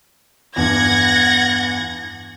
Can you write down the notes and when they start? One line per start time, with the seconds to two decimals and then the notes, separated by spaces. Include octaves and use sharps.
0.56 E2 G2 F#5 G#6 A#6